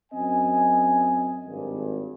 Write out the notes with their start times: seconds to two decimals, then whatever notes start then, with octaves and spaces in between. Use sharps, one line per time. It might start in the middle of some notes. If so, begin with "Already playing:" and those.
0.13 F#2 C4 D#5 G#5
1.47 G#1 G2